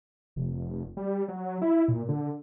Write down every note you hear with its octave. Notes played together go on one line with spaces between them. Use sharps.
F1
G3
F#3
E4
A#2
D3